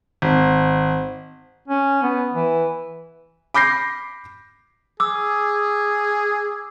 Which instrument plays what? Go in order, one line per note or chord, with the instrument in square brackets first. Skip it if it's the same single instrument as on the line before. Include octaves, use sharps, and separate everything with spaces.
[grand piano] G#1
[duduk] C#4
B3
E3
[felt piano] B5 D6 G6 A#6 C7
[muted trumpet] G#4 [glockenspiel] D6 E6